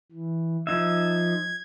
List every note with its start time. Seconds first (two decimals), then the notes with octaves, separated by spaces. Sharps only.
0.12 E3
0.67 F3 D#4 E5 G#6